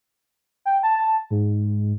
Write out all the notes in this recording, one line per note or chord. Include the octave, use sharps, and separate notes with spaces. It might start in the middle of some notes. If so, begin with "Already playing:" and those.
G5
A5
G#2